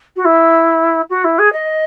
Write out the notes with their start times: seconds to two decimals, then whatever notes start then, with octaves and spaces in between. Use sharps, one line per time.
0.16 F#4
0.25 E4
1.10 F#4
1.24 E4
1.39 G#4
1.53 D#5